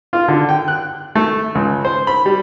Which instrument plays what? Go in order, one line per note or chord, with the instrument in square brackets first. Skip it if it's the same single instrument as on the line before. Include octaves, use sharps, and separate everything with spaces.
[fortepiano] F4
D3
G5
F#6
A3
C#2
C5
B5
G3